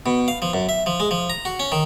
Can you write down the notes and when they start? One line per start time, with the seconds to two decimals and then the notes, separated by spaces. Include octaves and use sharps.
0.06 B2
0.28 F5
0.42 F3
0.53 F#2
0.69 E5
0.86 F3
1.00 G#3
1.11 F3
1.30 A#5
1.45 F#4
1.60 C#4
1.72 D#3